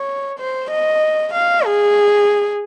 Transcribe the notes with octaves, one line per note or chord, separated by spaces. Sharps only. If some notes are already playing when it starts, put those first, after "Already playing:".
Already playing: C#5
C5
D#5
F5
G#4